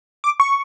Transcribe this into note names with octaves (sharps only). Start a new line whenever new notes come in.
D6
C#6